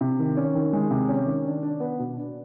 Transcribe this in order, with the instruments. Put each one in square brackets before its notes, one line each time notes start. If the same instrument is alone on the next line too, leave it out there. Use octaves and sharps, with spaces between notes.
[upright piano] C3
D#3
C#4
D#3
G#3
C3
C#4
D#3
D4
D4
B3
B2
D4